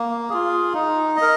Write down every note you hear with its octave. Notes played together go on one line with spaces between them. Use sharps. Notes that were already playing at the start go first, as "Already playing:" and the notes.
Already playing: A#3
F4 G#4
D#4
D#5
A#4